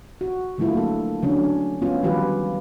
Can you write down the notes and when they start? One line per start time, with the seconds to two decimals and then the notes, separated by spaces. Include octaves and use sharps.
0.21 F#4
0.58 D3 F#3 A3 E4 F4
0.73 A#3 A4
1.23 D3 F#3 C#4 D4
1.82 B3 C#4 F4
2.03 D#3 F#3 G3 F4 G4 B4